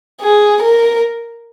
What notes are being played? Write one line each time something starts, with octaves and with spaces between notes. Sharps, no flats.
G#4
A#4